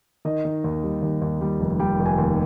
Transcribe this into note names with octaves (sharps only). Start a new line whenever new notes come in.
D#3 D#5
D#3
D#2
G3
D#2
D#2
G3
F1
G3 G5
F1
G#5
D#2